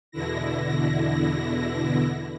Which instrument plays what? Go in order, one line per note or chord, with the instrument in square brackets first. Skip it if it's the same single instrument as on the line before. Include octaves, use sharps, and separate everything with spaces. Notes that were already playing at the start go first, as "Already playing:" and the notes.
[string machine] E2 B2 D3 E4 A#6